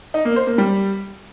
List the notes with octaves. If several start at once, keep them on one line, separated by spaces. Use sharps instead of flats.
D#4
A#3
C5
A#3
G3